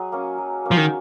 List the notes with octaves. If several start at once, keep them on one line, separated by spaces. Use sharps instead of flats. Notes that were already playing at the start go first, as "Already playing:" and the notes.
Already playing: F#3 G#4 D#5
A#3 C#4
F#3
A#3 C#4
F3
D#3